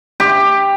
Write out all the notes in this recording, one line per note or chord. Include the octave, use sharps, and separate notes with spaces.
G4